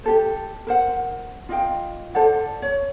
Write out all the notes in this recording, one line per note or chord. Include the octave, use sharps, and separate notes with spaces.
G4 A4 C5
A#4 C5 F#5
F4 D#5 F5 G5
A4 C5 D5 F#5
C#5